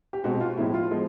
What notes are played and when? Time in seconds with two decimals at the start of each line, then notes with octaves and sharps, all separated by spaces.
0.13 G4
0.24 B2 G#3 C4 F#4
0.41 F4
0.57 A2 F3 G#3 B3 E4
0.74 F4
0.91 F3 G#3 B3